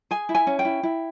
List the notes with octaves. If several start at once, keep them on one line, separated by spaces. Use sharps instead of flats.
G#4 G#5
E4
G#5
C#4
G5
E4
E4